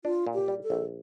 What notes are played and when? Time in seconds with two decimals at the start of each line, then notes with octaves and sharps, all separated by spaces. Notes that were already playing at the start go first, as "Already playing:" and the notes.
0.05 D4 F4
0.27 A#2
0.34 G4
0.48 G3
0.64 A4
0.70 A#1